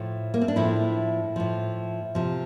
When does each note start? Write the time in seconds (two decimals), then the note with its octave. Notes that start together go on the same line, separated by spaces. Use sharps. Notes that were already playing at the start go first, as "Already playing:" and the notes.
Already playing: A2 F3
0.34 A#3
0.41 C4
0.48 D4
0.56 A2 F3 E4
1.36 A2 F3
2.15 C3 F3